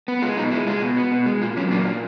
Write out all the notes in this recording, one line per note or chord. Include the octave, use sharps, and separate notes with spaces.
B3
G#3 F4
B2 D#4
G#3 E4
G#3 F4
B2
B3
B2
G#3
A#2 F4
F#3 C#4
A#3 D4
A#2